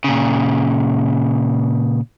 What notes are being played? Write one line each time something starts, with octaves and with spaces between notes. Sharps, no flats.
A#2 C#3